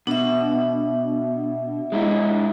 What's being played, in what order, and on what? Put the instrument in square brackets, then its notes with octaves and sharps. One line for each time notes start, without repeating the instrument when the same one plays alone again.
[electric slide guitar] B2 [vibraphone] D4 E5
[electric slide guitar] G#3 D#4 E4